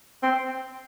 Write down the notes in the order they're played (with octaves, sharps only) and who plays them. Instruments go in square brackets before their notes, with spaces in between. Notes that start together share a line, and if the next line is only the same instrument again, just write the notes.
[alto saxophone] C4